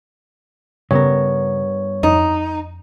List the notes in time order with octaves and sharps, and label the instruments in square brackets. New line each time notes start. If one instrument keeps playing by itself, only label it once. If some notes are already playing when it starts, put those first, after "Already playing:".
[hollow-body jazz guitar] G2 B3 A#4 [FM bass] C#3 [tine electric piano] C#5
[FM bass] F2 [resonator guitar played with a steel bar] D#4